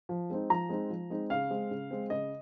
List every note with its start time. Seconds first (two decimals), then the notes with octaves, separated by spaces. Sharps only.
0.09 F3
0.30 G#3 C4 D#4
0.50 F3 A#5
0.69 G#3 C4 D#4
0.90 F3
1.10 G#3 C4 D#4
1.30 C#3 F5
1.50 G#3 C4
1.71 C#3
1.90 G#3 C4
2.10 C#3 D#5